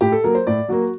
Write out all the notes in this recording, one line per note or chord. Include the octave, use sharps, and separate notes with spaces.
A2 G4
A4
F#3 A#3 A#4
C5
A2 D5
F#3 A#3 F#4